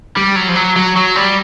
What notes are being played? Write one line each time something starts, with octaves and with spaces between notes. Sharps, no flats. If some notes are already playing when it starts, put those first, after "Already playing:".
G3
F#3
F3
F#3
F#3
F#3
G3